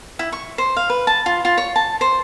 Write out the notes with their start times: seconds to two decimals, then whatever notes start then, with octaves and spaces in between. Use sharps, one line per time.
0.19 E4
0.32 C#6
0.58 C5
0.77 F5
0.90 B4
1.07 A5
1.26 F4
1.45 F4
1.58 C#5
1.76 A5
2.01 C5